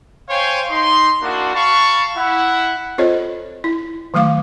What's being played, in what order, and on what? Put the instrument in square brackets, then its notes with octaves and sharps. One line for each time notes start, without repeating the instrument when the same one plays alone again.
[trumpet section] C5 C#5 F5 G5 G#5 C6
D#4 C6
A#3 D4 E4 F#4
F5 A5 B5 C#6
E4 F#5
[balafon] C4 F4 A4 C5 C#5 D#5
E4
D#3 F#3 A3 F5 D6